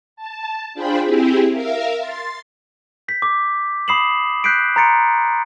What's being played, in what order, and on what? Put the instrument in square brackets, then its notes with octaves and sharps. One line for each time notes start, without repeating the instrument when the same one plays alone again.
[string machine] A5
D4 F4 G#4 C5 G5 B5
C4 E4 G4 G#4
A#4 E5 F5
C6 A6
[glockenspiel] G6 B6
D6
B5 D#6 C7 E7 F#7
F#6 G6 B6 C7 D7
A#5 C6 A6 C#7 D7